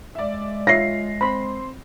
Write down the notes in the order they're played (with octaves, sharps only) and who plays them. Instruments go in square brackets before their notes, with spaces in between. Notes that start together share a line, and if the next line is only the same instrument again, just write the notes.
[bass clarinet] G#3 [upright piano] D5 E5
[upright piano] F4 [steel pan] C#5 E5 [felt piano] A#6 C7
[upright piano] C4 C6 [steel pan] B5